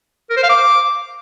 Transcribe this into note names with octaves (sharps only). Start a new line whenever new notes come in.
A#4
C5
F5
D6